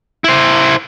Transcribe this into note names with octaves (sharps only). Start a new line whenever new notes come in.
E4 C5